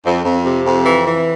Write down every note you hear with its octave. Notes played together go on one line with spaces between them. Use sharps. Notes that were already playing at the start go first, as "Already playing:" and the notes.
F2
F2
C3
F2
E3
E3